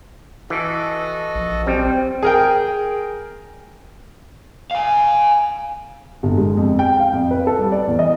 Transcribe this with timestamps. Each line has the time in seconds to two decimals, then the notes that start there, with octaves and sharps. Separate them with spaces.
0.50 E3 F#4 A4 D#5
1.35 A#1
1.67 G3 C4
2.23 G#4 A#4 G5
4.71 F5 G#5
6.23 G1
6.38 G#3
6.57 F2
6.79 G5
7.00 F5
7.13 F2
7.31 B4
7.47 A4
7.59 G3
7.72 D5
7.87 E2
7.99 D#5